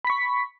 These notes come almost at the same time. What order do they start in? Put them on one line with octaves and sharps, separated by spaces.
B5 B6 C#6